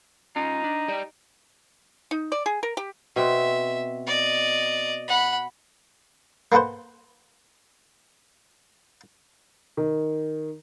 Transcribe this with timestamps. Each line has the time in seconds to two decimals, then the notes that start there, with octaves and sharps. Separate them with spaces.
0.36 C#4 D#4 F4
0.64 D4
0.88 G4 D5
2.11 D#4
2.32 D5
2.46 G#4
2.63 A#4
2.77 G4
3.16 B2 C4 E5
4.07 D5 D#5
5.08 F#5 B5
6.52 A#3 B3 A4 B4 C5
9.77 D#3